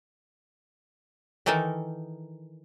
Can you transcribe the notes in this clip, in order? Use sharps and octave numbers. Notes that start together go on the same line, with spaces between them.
D#3 E3 D#4 A4 A#4